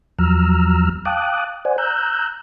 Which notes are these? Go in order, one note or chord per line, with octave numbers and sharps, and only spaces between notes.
E2 F3 F#3 A#5 E6 F6
F5 G5 A5 D6 D#6 F#6
C5 D5 F#5 G#5
A#5 E6 F#6 G6